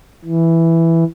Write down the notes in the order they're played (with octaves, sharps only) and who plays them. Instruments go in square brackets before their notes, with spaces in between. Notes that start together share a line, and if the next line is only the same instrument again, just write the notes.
[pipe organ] E3